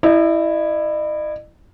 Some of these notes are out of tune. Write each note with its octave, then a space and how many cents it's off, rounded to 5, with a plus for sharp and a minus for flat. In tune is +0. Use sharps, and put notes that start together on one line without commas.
E4 +0 D#5 -45